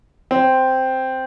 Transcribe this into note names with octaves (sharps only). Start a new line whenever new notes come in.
C4